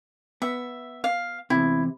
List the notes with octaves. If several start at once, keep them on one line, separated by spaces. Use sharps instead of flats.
B3 E5
F5
E2 C3 E4